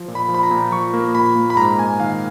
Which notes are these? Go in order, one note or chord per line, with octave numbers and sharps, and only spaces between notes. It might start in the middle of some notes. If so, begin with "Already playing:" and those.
Already playing: F3
A#2
B5
F3
B5
A#5
A#2
F3 C#6
A#3
A#2 B5
A#3
B5
G#2 A#5
A#3 G#5
D#3 F5